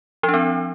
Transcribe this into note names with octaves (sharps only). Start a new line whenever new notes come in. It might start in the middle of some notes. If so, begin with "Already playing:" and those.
F3
D4
C4